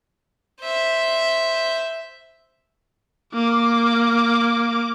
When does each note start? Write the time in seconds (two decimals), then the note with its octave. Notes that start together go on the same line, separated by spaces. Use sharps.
0.62 C5 E5
3.34 A#3 D6